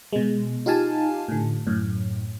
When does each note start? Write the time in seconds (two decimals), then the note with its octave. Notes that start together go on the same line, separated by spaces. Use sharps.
0.13 B2 G#3
0.66 D#4 F4 G4 F5 G#5 A5
1.28 A2 D3
1.67 F#2 A2